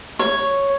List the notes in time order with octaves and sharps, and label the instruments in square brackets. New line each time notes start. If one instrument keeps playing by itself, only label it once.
[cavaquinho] C#5